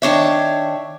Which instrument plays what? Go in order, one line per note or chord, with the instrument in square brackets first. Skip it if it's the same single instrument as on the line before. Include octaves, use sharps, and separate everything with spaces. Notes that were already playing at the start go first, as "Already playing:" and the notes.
[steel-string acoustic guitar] D#3 D4 C#5 E5